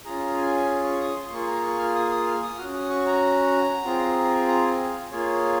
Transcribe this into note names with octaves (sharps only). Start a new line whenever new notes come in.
C#4 F4 G#4 A#5
G#5
C#6
D#6
C6
C6
A#3 F4 G#4 C#6
A#5
C#6
F6
D#6
D#6
F6
D#6
C#4 F#4 F6
D#6
C#6
A#5
C4 F4 G#4
A#5
G#5
F5
A#3 F4 G#4 C#5